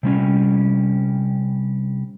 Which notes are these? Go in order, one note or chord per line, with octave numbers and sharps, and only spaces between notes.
C3 G3 C#4